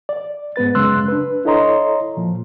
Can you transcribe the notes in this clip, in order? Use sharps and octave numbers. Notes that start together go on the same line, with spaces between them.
D5
G#2 B3 B4 A6
F#2 C#3 G#3 C6 E6 F#6
D4 B4
E4 A4 C#5 D#5 A#5 C6
A#2 F3